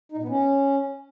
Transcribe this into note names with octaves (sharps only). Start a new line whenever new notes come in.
D#4
A#2
B3
C#4